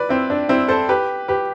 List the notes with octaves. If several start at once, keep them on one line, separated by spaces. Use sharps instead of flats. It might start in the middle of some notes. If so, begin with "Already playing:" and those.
Already playing: B4 D5
C4 E4
D4
C4 E4
A4 C5
G4 B4
G4 B4